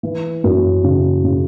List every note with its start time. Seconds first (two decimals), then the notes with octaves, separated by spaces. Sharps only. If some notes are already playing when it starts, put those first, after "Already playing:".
0.03 E3
0.44 F#2
0.84 C#3
1.24 C#3